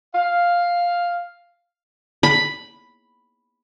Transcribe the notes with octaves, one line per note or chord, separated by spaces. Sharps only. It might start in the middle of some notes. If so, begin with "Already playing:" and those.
F5
B5